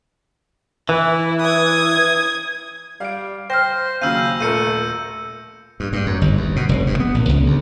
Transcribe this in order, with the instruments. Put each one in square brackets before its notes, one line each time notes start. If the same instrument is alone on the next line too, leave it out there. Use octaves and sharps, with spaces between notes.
[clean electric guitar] E3 [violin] E4
[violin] D#6 G#6
[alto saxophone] G3 [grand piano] F5 D7
[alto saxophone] C5 [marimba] G5 F6 [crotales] A#6
[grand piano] D#2 C#3 F#3 [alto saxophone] F5 [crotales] E6 G6 D#7
[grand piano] D#1 A#1 A#4 [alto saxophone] A3 [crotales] C#7 D#7
[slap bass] G2
G2
F#2
G1
D#2
B2
F1
G2
B3
A#1
C#2
D2